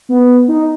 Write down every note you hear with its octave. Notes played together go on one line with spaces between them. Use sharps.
B3
D#4